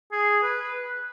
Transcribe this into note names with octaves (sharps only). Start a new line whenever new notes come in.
G#4
B4